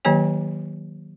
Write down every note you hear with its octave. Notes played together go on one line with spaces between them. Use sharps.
D#3 F#3 A#3 G4 C#5 G#5